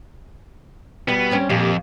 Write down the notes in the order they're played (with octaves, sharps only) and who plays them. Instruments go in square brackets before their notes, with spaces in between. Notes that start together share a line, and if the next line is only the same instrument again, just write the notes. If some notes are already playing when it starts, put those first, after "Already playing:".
[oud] B2 G3 [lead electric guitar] B3
[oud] G3 C4 C#4
[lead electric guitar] F2 [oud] A#2 G4